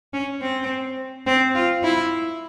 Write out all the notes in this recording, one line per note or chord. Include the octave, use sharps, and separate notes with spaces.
C#4
C4
C4
F4
E4